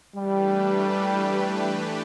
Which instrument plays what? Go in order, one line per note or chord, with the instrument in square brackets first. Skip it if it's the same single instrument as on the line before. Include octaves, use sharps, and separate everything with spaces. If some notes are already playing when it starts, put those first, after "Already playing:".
[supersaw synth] E3 A3 D4 G4 B4 [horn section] G3